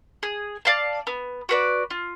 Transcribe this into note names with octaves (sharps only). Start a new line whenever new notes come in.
G#4
D5 F5 A5
B3
F#4 B4 D5
F4